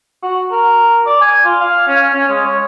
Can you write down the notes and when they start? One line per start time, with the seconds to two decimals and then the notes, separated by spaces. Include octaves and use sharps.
0.23 F#4
0.52 A#4
1.06 D5
1.21 G#5
1.45 F4
1.61 F5
1.87 C#4
2.15 C#4
2.29 G#3
2.45 C#5